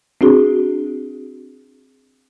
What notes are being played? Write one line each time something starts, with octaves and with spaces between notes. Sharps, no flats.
C4 D4 F#4 G#4